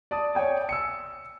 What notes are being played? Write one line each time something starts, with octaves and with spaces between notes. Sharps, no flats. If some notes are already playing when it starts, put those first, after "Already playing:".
D5 A5 D#6
C#5 D5 G5 G#5
E6 C#7